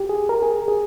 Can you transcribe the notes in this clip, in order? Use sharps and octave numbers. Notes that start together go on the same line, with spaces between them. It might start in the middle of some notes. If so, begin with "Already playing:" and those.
Already playing: G4
G#4
A#4
G#4
G#4